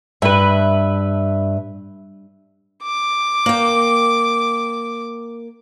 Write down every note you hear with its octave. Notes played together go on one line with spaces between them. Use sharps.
G2 B4 E5
D6
A#3 G5